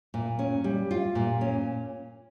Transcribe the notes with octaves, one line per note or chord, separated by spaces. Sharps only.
A#2
C#4
G3
F4
A#2
C#4